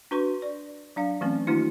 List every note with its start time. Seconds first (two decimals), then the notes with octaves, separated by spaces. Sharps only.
0.11 D4 F#4 B4 C6 C#6
0.42 D5
0.96 F#3 D4 F5
1.21 E3 F#3 A3 C4 C#4
1.47 D#3 A3 A#3 D4 E4 F#4